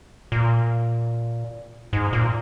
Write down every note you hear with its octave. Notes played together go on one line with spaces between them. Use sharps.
A#2
G#2
A#2